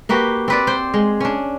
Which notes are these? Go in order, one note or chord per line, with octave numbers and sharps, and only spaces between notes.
A#3 F#4 G4 B4
C4 B4 D5
C5 G5
G#3
C#4 D4